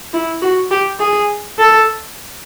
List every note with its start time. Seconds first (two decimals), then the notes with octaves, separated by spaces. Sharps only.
0.13 E4
0.42 F#4
0.71 G4
1.00 G#4
1.58 A4